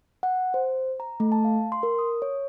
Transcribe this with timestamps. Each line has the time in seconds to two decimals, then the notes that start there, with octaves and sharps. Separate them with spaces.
0.23 F#5
0.54 C5
1.00 A#5
1.20 A3
1.32 A5
1.45 F5
1.72 C6
1.83 A#4
1.99 D#6
2.22 C#5